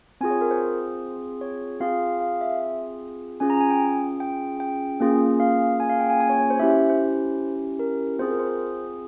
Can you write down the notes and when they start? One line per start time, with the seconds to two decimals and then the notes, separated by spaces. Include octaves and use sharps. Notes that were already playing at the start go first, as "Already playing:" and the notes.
0.21 C4 F4 G#4 G#5
0.30 C#5
0.41 A#4
0.51 C5
1.41 C#5
1.80 C4 F4 G#4 F5
2.20 F5
2.41 E5
3.40 C#4 F4 G#4 G#5
3.50 A#5
3.61 G#5
3.70 G5
4.20 G5
4.60 G5
5.00 A#3 C#4 F4 G#4
5.40 F5
5.80 G#5
5.90 F5
6.00 G5
6.10 G#5
6.20 G#5
6.30 C#5
6.40 C#5
6.50 C5
6.59 C#4 E4 G4 E5
6.70 C5
6.90 C5
7.79 A#4
8.19 C4 F4 G#4 C5
8.30 A#4
8.39 C5
8.50 C5